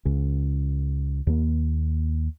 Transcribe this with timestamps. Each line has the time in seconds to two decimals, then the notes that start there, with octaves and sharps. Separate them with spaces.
0.05 C#2 C#3
1.27 D#2 A#3